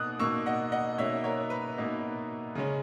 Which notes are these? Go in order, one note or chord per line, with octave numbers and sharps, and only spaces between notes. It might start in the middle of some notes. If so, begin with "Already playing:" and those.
Already playing: B2 A#3 D#4 D#6 F#6
B2 A#3 D#4 C#6 E6
D#5 F#5
D#5 F#5
B2 A#3 D#4 C#5 E5
A#4 C#5
B4
B2 A#3 D#4
C#3 G#3 C#4